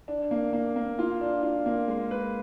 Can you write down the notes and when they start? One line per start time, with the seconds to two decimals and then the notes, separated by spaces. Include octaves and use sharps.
0.08 D4
0.31 A#3
0.53 A#3
0.76 A#3
0.99 F4
1.21 D4
1.43 F4
1.66 A#3
1.88 G#3
2.11 B4